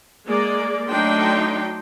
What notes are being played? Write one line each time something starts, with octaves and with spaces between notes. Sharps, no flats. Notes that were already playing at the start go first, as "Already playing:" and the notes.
G#3 A#3 D5
F#3 A3 D4 D#4 G5 C6